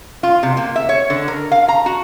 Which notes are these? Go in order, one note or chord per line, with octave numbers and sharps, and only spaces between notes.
F4
C3
A#3
E5
C#5
D3
A#4
F5
A#5
F#4